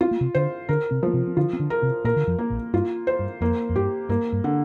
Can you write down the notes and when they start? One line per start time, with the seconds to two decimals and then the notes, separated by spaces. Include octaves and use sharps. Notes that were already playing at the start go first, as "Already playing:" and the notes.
0.01 C4 F4
0.11 A#3
0.21 C3 C4
0.35 D3 D4 C5
0.69 D3 D4 A#4
0.91 C3 C4
1.03 F3 A#3
1.14 C3 C4
1.27 C4
1.37 D3 D4 F4
1.53 C4
1.60 D3 D4
1.70 A#4
1.82 C3 C4
2.04 A#2 A#3 A#4
2.16 D3
2.27 F2 F3
2.38 A#3
2.50 A#1 A#2
2.73 G2 F4
3.07 C5
3.19 G2
3.41 F2 A#3
3.69 F2
3.76 G2 G4
4.09 G2 A#3
4.33 G2
4.44 D3